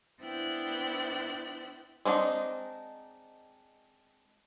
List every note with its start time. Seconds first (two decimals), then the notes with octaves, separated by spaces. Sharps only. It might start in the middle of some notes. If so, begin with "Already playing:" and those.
0.22 B3 D4 E4 C5 G5 F#6
2.05 G#3 C4 D4 D#4